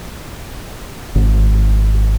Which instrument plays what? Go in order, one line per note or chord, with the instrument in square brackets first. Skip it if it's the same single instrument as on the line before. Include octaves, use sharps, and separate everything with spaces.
[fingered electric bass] G#1